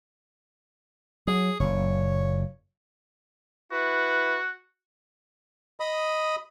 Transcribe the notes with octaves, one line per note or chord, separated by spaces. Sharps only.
F#3 G#4
F#1 A#2 C#5
E4 F#4 B4
D#5 B5 D#6